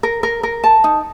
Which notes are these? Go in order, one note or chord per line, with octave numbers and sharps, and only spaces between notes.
A#4
A#4
A#4
A5
D#4